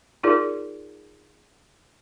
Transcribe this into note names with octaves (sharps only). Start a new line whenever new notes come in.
D#4 F4 G#4 A#4 D5